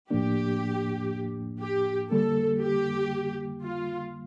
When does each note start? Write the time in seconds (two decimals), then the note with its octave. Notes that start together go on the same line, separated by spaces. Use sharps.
0.11 A2 F3 A#3 D4 G4
1.61 G4
2.11 D3 G3 A#3 A4
2.62 G4
3.62 F4